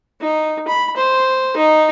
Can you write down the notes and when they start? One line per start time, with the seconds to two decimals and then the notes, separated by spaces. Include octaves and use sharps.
0.21 D#4
0.68 B5
0.97 C5
1.56 D#4